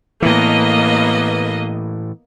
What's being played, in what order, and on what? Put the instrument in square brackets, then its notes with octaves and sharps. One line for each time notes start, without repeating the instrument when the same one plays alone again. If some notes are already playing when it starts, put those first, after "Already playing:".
[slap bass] A2 E3 [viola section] A#3 B3 D#5